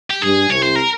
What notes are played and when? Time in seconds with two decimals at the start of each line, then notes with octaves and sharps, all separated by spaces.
0.10 G4
0.22 G2 G3 G#4
0.49 C2 C3 C#5
0.63 C5
0.76 A#4